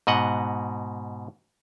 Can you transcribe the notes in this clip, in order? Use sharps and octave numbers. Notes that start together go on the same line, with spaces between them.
G#2 B2 D#5 F#5